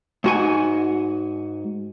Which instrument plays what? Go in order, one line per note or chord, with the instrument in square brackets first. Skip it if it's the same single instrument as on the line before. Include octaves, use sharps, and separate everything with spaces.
[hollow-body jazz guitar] G#2 F#4 G#5